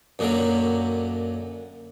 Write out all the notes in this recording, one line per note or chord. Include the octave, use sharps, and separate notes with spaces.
F#2 A#2 D3 F#3